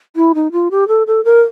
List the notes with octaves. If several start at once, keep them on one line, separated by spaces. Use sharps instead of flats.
E4
D#4
F4
G4
A4
A4
A#4